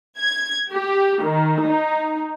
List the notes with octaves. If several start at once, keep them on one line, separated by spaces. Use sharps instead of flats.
G#6
G4
D#3
D#4